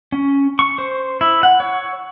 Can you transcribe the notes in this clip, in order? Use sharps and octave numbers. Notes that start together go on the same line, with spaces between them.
C#4
C#6
C5
E4
F#5
C#5